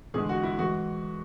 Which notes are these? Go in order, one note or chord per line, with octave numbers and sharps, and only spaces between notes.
E2 D3 G#3 G#4
F#4
E4
E3 G#3 F#4